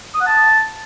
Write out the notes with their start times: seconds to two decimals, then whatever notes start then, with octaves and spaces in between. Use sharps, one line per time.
0.15 D#6
0.21 F#5
0.26 A5